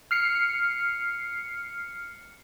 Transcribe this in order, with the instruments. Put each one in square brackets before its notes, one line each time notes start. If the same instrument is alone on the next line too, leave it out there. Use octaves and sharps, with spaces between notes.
[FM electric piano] F6 C7 C#7